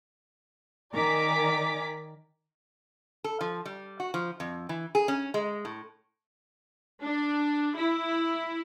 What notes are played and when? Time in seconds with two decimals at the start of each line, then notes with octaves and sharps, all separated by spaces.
0.93 D#3 A#4 D5 G#5 D6 B6
3.24 A4
3.41 F3
3.65 G3
4.00 F#4
4.14 F3
4.40 F2
4.69 E3
4.95 G#4
5.08 C#4
5.34 G#3
5.65 A2
7.02 D4
7.76 E4